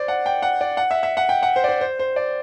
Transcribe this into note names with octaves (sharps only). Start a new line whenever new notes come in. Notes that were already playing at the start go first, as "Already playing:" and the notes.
Already playing: C5 D5
F#5
G5
F#5
D5
F#5
E5
E5
F#5
G5
F#5
C5
D5
C5
C5
C5
D5